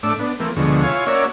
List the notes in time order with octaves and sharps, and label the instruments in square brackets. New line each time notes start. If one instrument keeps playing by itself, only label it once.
[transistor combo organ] A2 A3 D4 E5 D6
B3 D4
E3 A3 A#3 C4
D2 B2 D3 F3 G#3 C#6
E4 F4 C#5 F5 G#5 C#6
A#3 C#4 F#4 C#5 D5 E5